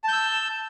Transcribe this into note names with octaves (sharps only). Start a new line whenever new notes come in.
A5 E6 G6